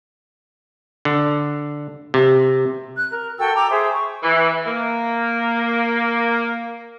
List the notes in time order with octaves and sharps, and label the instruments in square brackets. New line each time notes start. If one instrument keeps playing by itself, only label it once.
[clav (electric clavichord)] D3
C3
[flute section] F#6
A#4
F#4 A4 G5 E6
G5 A#5 D6 E6
G#4 C5 E5
C#6
[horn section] E3
A#3